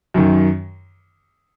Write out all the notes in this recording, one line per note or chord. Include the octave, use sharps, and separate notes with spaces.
F#2 D#3